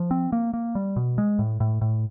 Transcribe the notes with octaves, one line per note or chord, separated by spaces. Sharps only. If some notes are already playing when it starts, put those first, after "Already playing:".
Already playing: F3
C4
A#3
A#3
G3
B2
G#3
A2
A2
A2